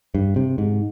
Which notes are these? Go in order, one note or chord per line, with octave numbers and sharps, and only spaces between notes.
G2
C3
G#2